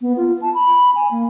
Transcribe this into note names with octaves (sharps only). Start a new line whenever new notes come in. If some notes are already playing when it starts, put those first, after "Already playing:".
B3
F4
A5
B5
G#5
A#3